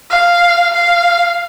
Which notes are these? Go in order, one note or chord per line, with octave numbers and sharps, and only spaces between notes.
F5
F5